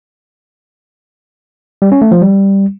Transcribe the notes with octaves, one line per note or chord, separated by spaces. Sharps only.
G3
C#4
A3
F3
G3